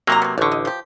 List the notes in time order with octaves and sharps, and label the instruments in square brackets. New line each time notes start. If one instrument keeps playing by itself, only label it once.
[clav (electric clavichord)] C3 F#3 A#3 [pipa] D#3 A#4 A#5
[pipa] A3 B3
[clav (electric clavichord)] A1 D3 [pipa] D5 C#6
[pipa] D#5
F3 G4